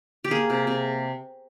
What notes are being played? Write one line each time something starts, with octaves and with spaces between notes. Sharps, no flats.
G4
A#3 G#4
C3
C3